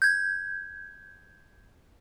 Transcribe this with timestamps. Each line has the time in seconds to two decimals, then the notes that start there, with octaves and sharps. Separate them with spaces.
0.02 G6 G#6